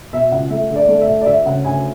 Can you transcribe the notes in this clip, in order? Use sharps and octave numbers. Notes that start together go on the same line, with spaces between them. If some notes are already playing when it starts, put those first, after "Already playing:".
B2 E5
C#2 F#5
A3 E5
D3
D5
A3
E5
D2
D5
D2 E5
C#3 F#5
D2 G#5